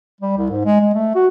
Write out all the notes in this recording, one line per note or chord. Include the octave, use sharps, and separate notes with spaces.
G3
C2
G#2
G#3
G#3
A3
F#4